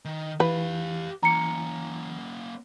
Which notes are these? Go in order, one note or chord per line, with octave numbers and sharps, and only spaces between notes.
D#3
E3 G4 B4 F5
E3 A#3 C#4 A#5 C#7